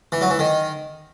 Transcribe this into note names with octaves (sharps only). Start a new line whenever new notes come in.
E3
F#3
E3
D#3